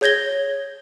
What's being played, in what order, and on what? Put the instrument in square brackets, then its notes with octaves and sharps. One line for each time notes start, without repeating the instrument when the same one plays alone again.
[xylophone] G#4 C#5 G6 G#6 A#6 G7